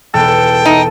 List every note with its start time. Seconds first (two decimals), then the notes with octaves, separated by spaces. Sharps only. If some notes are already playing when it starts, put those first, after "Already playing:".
0.14 E1 B3 A4 G5
0.66 D#4